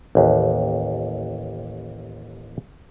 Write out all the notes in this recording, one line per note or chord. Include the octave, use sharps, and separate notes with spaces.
A1 D#2